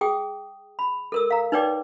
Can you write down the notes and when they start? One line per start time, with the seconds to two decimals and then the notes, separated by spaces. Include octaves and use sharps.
0.01 G#4 G5 D#6
0.79 B5
1.12 A4 A#4 E6
1.31 F5 A#5
1.52 D#4 B4 C#5 D5 G5 D6